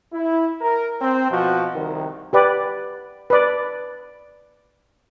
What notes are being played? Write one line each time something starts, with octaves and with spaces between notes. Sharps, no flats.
E4
A#4
C4
B2 F3 F#4
C2 D#3
G4 B4 D5
B4 D5